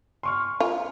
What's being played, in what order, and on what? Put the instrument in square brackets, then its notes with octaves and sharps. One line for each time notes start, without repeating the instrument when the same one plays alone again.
[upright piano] C6 C#6 F6
[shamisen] F4